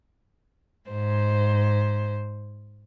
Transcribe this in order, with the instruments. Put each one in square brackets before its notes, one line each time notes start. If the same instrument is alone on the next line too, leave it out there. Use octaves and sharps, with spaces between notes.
[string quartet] G#2 C5